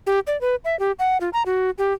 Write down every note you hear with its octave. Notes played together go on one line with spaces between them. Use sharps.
G4
D5
B4
E5
G4
F#5
F4
A#5
F#4
G4